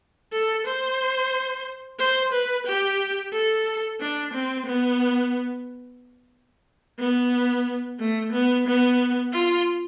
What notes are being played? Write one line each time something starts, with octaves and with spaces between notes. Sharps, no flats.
A4
C5
C5
B4
G4
A4
D4
C4
B3
B3
A3
B3
B3
F4